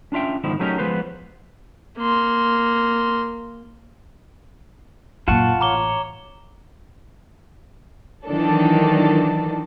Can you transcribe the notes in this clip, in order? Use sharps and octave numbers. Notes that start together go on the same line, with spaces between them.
C#4 D4 F4 E5 G5
G#2 B2 D3 D#3 F3 E4
F#3 A3 C#4 D#4 G4 A#4
F3 F#3 G#3 B3 B4 C5
A#3 C6
F#2 A#2 F4 F#5 A5 C#6 E7
A1 C#5 A#5 D6 G7
D#3 E3 F#3 D4 A4